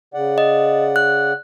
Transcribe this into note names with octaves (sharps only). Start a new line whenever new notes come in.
C#3 D5 F#5
D#5
F#6